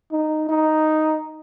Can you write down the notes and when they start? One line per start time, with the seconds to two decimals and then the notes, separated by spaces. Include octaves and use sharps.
0.12 D#4
0.49 D#4